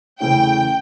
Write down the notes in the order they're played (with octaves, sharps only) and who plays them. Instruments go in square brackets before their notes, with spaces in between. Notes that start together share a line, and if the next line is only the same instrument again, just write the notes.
[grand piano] E2 C#3 E3 A3 C#4 [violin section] G5